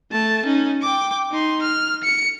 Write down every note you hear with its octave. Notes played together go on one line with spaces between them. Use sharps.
A3 A5
C#4 D#4
G5 D6
D#4 C6
F6
C#7